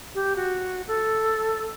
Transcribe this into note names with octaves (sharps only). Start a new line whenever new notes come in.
G4
F#4
A4